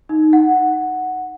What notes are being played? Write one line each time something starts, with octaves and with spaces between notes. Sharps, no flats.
D#4
F#5